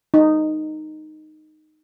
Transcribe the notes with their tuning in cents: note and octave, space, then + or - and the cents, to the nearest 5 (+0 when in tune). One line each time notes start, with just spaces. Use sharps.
D#4 -10